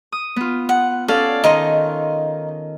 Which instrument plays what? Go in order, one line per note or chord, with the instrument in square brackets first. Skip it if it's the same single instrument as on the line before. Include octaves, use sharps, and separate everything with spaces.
[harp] D#6
B3 F4
[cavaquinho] F#5
[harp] C#4 A4 F5 [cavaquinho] D5
[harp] D#3 [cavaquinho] D#4 D#5 C6